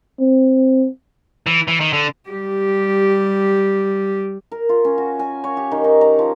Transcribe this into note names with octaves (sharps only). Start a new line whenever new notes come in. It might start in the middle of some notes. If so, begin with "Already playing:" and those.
C4
E3
E3
D#3
D3
G3 G4
A#4
F4
C#4
F#4
G#5
C#5
G4
D#3
D#4
A#5
F3